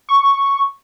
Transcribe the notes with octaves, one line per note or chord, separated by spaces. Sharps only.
C#6